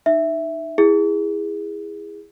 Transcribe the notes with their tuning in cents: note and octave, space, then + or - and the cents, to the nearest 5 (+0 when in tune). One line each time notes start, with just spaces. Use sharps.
D#4 -25 E5 +0
E4 +0 G#4 -15